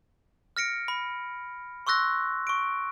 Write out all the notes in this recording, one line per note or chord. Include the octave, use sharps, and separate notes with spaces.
F6 A#6 C#7 D7
B5
C6 C#6 E6 F#6 A#6
C#6 D7